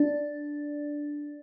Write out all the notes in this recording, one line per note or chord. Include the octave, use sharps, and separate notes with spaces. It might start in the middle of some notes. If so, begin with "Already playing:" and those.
Already playing: D4